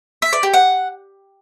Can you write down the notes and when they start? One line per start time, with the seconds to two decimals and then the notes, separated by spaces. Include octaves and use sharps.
0.22 E5
0.33 D5
0.43 G4
0.54 F#5